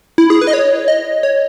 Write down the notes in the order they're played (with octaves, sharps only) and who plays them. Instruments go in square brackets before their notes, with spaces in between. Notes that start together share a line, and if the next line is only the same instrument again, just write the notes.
[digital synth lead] E4
G#4
B4
D#5
C#5
D#5
C#5